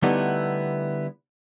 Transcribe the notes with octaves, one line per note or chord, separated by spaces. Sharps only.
D3 G3 A3 B3 D#4 E4